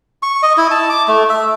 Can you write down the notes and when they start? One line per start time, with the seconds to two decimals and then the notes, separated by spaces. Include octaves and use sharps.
0.23 C#6
0.43 D#5
0.57 E4
0.71 A5
0.90 D6
1.08 A3
1.29 E5